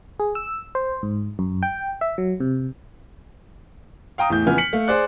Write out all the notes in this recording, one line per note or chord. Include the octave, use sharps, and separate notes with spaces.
G#4
E6
C5
G#2
F#2
G5
E5
F#3
C3
F5 G5 A#5 D#6
E2 A2 G6
C#3 E3 F3 B3 G#5 F6
B6 C#7 F#7
A3 F5
G#4 C5 D5 F#6